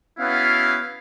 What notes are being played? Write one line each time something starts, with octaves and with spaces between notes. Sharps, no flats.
B3 C#4 E4 F#4 F5